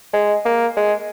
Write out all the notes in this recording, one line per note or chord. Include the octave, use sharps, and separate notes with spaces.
G#3
A#3
G#3